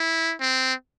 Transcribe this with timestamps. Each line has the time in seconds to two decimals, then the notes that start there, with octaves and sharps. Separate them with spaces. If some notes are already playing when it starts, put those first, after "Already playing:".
Already playing: E4
0.41 C4